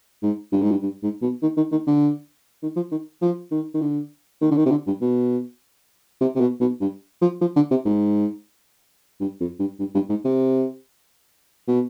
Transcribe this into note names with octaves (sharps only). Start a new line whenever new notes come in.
G#2
G2
G#2
G2
G2
G#2
B2
D#3
D#3
D#3
D3
D#3
F3
D#3
F3
D#3
D#3
D3
D#3
D3
D#3
C3
D3
G2
B2
C3
C3
B2
B2
G2
F3
F3
D3
C3
G#2
G2
F2
G2
G2
G2
G#2
C3
B2